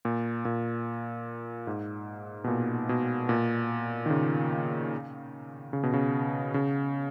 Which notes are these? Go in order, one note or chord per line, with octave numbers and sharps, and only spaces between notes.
A#2
A#2
G#2
B2
A#2
B2
A#2
D#3
C#3
C#3
B2
C#3
C#3